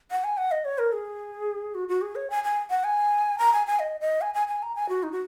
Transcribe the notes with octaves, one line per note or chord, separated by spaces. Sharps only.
F#5
G#5
F#5
D#5
C#5
A#4
G#4
F#4
F#4
G#4
C#5
G#5
G#5
F#5
G#5
A#5
G#5
G#5
D#5
D#5
G#5
G#5
G#5
A#5
G#5
F#4
D#4
F#4